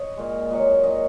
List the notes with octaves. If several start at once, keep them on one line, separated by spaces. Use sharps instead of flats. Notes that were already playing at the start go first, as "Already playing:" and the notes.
Already playing: C#5 D#5
A#2 G#3
A#2 F#3 D#5
A#2 F#3 D#5